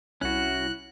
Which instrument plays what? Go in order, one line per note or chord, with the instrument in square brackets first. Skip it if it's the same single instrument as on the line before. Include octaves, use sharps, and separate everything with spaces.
[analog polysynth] C2 E4 [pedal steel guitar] C#4 F#4 [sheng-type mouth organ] F#6